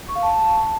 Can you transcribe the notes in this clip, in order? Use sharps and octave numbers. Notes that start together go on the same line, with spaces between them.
C#6
F5
A5